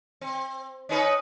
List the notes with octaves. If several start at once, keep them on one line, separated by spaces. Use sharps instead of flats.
C4
C#4 D#4 B4